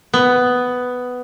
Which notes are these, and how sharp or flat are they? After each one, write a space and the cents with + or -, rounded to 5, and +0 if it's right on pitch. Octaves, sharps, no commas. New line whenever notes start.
B3 +10